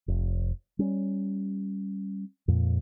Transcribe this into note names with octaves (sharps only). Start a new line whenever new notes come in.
F1
G3 C#4
F2 A#2